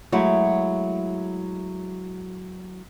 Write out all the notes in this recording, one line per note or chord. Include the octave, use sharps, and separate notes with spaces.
F#3 G#3 A3 E4 F#4